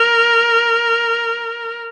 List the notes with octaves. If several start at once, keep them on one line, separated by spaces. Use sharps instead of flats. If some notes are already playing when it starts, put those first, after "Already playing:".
Already playing: A#4